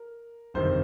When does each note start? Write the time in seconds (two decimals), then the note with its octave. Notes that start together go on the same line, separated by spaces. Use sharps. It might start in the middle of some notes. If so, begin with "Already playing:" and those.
Already playing: A#4
0.54 G1 F2 C3 D#3 C5